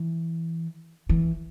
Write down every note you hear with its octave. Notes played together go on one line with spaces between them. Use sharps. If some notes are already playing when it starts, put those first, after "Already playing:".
Already playing: E3
E3